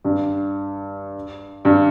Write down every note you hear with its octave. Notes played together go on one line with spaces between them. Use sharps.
G2
G2